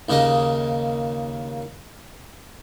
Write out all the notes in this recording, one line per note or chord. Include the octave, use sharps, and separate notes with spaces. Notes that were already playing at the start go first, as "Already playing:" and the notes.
D#2 C#3 A#3 D#5